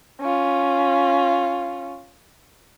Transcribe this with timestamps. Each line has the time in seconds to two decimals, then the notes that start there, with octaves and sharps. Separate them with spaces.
0.21 C#4 F4